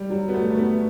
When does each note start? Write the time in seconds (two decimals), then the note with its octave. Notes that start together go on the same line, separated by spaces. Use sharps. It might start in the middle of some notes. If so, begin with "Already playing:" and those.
Already playing: G3
0.10 F#3
0.28 B3
0.34 A3
0.51 A3
0.58 B3